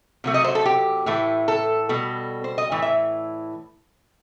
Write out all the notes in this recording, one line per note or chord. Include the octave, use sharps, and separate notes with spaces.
C3 F#3 A3
D#5
C5
A4
G4
A2 E3 A3
A4
B2 G3
C5
D#5
A2 E3
E5